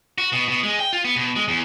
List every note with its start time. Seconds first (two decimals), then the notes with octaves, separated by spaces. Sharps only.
0.18 F#4
0.32 B2
0.48 B2
0.63 G#3
0.79 G5
0.93 F4
1.05 B3
1.16 B2
1.36 G#3
1.48 E2